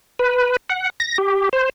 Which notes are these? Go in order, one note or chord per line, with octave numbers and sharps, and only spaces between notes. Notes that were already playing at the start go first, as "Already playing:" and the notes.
B4
F#5
A#6
G4
C5